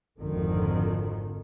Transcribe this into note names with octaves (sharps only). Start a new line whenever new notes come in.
G#1 F2 D3 D#3 F3